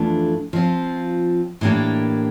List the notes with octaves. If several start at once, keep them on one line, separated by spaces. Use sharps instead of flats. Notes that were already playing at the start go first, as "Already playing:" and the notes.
Already playing: F2 E3 A3 D4 F4
F3 C4 F4
A2 E3 A#3 D4 G4